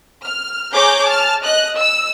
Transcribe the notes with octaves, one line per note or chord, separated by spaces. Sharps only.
F6
G#4 C#5 A#5 D6 G6
A5 F6
D#5 F#6
E6